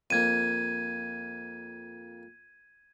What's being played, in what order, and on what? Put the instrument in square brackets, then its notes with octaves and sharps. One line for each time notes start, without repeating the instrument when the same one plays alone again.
[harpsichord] F2 A#3 [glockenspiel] G#6 D#7